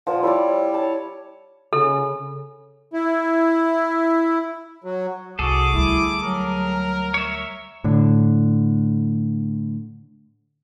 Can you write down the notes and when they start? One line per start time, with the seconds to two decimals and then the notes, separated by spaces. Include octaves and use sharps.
0.07 A#2 F3 F#5
0.23 G3 E4 C#5 D5
0.74 C#5 A5
1.73 C#3 A4
2.94 E4
4.84 F#3
5.39 C2 F#4 G#4 A4 D6
5.74 D2 G3 E4
6.23 F#3 A#4
7.14 C#5 E5
7.84 A2 D3